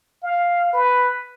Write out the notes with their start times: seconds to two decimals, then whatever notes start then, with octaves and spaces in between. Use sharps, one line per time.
0.23 F5
0.73 B4